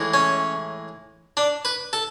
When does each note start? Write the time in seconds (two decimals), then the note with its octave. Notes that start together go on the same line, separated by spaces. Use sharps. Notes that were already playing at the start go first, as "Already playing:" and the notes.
Already playing: A2 E3 G#3
0.14 C#4
1.37 D4
1.65 B4
1.93 A4